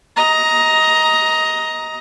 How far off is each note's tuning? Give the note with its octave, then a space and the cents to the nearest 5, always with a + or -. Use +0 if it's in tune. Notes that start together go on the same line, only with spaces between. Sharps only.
D#5 +20 A#5 +10